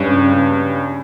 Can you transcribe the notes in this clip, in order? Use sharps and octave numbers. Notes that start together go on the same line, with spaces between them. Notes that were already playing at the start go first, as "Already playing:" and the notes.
Already playing: G2 C#4
C#3
C#3